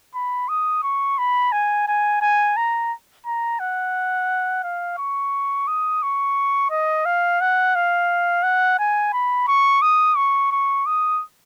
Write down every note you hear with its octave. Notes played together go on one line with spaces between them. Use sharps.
B5
D#6
C#6
B5
G#5
G#5
G#5
A#5
A#5
F#5
F5
C#6
D#6
C#6
D#5
F5
F#5
F5
F#5
G#5
B5
C#6
D#6
C#6
C#6
D#6